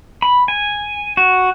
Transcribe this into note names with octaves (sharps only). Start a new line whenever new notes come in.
B5
G#5
F#4